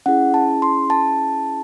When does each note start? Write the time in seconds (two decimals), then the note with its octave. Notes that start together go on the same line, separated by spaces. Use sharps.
0.06 C#4 E4 G#4 F#5
0.34 A5
0.62 C6
0.90 A5